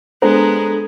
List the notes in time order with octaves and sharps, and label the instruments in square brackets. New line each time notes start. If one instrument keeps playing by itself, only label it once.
[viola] G#3 B3 [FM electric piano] D4 A4 A#5 [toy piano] C5